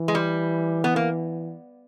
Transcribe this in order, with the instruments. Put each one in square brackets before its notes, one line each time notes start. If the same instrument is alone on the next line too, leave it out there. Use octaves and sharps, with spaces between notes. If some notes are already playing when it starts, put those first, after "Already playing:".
Already playing: [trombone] E3
[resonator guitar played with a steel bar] G#3
G3
B3
A#3